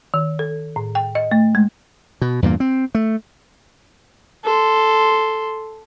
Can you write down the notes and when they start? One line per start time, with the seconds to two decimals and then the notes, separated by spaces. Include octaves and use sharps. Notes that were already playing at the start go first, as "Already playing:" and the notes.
0.14 D#3
0.39 A4
0.76 A2
0.95 G5
1.15 D#5
1.32 A3
1.55 G#3
2.21 B2
2.42 E2 G2 A#2 A#3
2.60 C4
2.95 A3
4.44 A4 C6